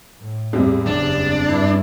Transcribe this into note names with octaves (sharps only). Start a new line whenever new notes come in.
A2
E2 G3 C4
F#1 D4
G2 E4